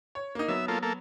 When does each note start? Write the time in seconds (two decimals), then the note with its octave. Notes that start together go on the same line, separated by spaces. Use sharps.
0.15 C#5
0.35 A#3 D#4
0.48 F#3 B3 E5
0.68 A#3 F4 A4
0.83 A#3 A4